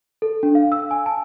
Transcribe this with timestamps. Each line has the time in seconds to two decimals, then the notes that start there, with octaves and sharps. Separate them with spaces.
0.22 A4
0.43 D4
0.55 F5
0.72 E6
0.91 G#5
1.06 A5